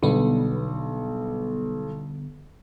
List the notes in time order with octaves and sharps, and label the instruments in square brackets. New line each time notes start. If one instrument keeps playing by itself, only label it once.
[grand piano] B1 [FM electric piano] D3 G3 B3